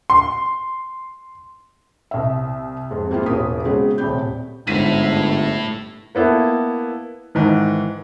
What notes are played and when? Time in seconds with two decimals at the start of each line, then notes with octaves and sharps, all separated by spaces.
0.10 C6
2.11 C2 E5
2.91 F2 G#2
3.11 G3 A#3 C4 E4 F4 G#4
3.26 E1 A1 A#4 D#6 B6
3.65 C#3 F#3 G#3 B3 C4
3.98 D#1 A2 C3 D5 B5 G6
4.67 G1 G#2 A3 E4 B6 D#7
6.15 A#3 B3 E4 A4
7.35 G#2 D#3 E3